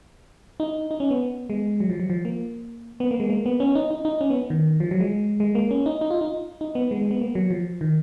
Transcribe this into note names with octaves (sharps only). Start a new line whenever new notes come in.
D#4
D#4
C#4
B3
G#3
F#3
F3
F#3
F3
A#3
B3
A#3
G#3
A#3
B3
C#4
D#4
D#4
D#4
C#4
B3
D#3
F3
F#3
G#3
G#3
A#3
C#4
D#4
D#4
F4
D#4
D#4
B3
G#3
G#3
B3
A#3
F#3
F3
D#3